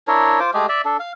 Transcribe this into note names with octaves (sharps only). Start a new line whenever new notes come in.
D4 E4 A#4 C#5
F4 C5 D6
G#3 A3 G4 G#4
D5 E5
D4 A4
F5